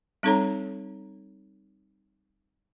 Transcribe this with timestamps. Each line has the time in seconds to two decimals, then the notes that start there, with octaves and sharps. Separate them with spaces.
0.23 G3 C4 D#4 A4 C#5 A#5